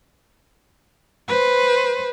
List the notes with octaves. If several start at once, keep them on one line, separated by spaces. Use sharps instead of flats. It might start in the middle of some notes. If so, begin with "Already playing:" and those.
B4 C5